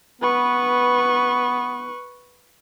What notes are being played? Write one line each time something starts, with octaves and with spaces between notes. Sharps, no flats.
B3 B4 C#6